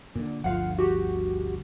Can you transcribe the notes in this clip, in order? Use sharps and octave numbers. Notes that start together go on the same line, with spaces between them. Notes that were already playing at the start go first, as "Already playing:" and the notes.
A#2 D3
G1 D2 F3 F4 F5 F#5
F#4 G4